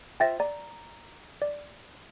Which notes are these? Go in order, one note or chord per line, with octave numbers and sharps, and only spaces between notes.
F4 C5 E5 G5 A6 A#6
D5 A#5
D5